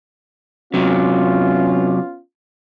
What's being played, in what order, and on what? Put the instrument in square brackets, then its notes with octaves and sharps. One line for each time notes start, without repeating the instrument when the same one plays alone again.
[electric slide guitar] C3 F#3 [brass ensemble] B3 C#4 F4